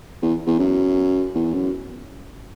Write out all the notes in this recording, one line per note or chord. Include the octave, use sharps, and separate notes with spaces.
E2
E2
F#2
E2
F#2